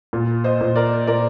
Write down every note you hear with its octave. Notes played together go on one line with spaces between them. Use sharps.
A#2
C5 D#5
A#2
A#4 D5
A#2 A#4 D5